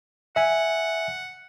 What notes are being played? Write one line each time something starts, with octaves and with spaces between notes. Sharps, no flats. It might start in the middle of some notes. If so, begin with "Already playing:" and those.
E5 F#5 G#5